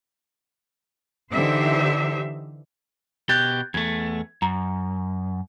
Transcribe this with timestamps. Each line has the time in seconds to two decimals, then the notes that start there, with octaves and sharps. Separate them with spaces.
1.33 D3 E3 D#4 G4 C5 E5
3.29 B2 G4 F#6 G6 A6
3.74 E2 A3 G#6
4.42 F#2 A#5